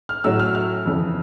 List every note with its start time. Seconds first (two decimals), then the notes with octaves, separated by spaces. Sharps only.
0.09 F6
0.24 A2 F#3 A3 C#4 E4 E6
0.40 F6
0.55 F6
0.86 F2 C#3 E3